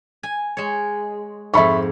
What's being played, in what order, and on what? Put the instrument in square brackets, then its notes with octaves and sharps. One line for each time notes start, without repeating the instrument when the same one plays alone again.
[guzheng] G#5
G#3 C#5
[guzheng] F2 G#2 [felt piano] E5 B5 C#6